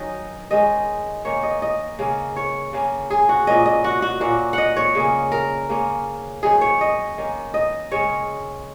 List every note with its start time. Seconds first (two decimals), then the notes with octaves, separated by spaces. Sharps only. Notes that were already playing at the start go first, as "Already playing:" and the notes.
Already playing: D#3 F#3 C#4 D#5
0.51 D#3 G#3 C#4 D#5
1.25 D#3 A#3 C#4 C#5
1.43 D#5
1.62 D#5
1.99 C#3 A#3 C#4
2.36 C#5
2.73 C#3 A#3 C#4
3.10 G#4
3.29 F#4
3.47 A#2 A#3 C#4 D#5
3.66 D#5
3.84 F#4
4.02 F#4
4.20 A#2 A#3 C#4 F#4
4.53 D#5 F#5
4.76 C#5
4.95 C#3 A#3 C#4
5.32 A#4
5.69 C#3 A#3 C#4
6.43 D#3 F#3 C#4 G#4
6.61 C#5
6.81 D#5
7.18 D#3 A#3 C#4
7.54 D#5
7.91 C#3 G#3 C#4 C#5